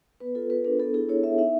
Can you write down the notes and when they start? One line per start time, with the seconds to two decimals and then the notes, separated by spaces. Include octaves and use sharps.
0.20 B3 B4
0.35 F4 A4
0.50 B3 B4
0.65 D4 A#4
0.79 B3 A4
0.94 E4 G#4
1.09 E4 C#5
1.24 B3 E5
1.38 D#4 E5